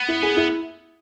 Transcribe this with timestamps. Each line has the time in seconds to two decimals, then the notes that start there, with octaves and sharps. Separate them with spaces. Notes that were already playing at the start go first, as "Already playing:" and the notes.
Already playing: B3
0.08 E4
0.23 G#4
0.37 E4